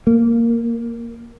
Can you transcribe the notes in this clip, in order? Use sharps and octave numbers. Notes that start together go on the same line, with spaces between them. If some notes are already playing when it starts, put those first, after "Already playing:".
A#3